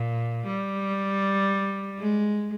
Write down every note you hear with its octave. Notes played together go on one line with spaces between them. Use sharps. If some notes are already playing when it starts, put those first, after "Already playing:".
Already playing: A#2
G3
G#3